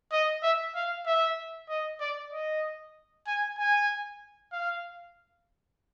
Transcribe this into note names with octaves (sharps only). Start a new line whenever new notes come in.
D#5
E5
F5
E5
D#5
D5
D#5
G#5
G#5
F5